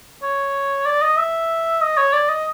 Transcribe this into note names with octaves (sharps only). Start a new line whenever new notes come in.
C#5
D5
D#5
E5
D#5
C#5
D5
D#5